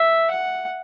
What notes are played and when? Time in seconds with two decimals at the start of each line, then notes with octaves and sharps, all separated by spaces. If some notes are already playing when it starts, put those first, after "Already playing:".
Already playing: E5
0.30 F#5